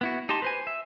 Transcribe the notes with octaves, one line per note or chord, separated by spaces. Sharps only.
B3 E4 F#4
D#4 G4 D#5 A5 C6
B4 C5 G#5
E5